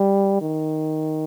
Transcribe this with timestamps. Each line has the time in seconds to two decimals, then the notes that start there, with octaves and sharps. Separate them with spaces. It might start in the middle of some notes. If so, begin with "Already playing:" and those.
Already playing: G3
0.41 D#3